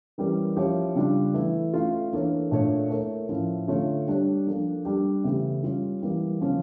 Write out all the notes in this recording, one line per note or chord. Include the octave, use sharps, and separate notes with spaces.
E3 G3 C#4 G4 A#4
F3 C#4 E4 G4 C#5
C#3 G3 D4 F4
E3 A3 E4
A3 C#4 F4
E3 A#3 D4 A4 C#5
A#2 A3 D4 A4 C#5
A3 E4 A#4 C#5
A2 F3 C#4 E4
D3 A3 C#4 F4 C#5
G3 D4 G4 C#5
F3 A#3 D4 A4
G3 D4 G4
C#3 E3 A3 E4 G4
G3 C#4 F4
E3 G3 A#3
C#3 F3 A#3 C#4